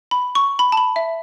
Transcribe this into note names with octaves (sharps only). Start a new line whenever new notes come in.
B5
C#6
B5
A5
B5
E5